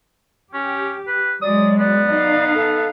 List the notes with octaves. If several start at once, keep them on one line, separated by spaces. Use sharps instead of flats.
C#4 G4
B4
F#3 G#3 D5 D#6
B3 D5
D#4 F5
A4